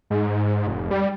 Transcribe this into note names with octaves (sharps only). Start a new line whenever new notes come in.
G#2
F1
G3